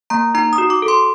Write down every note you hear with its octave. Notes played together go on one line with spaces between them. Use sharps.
A#3 A#5
D#4 A#5
D#6
F#4
D6
A4
C6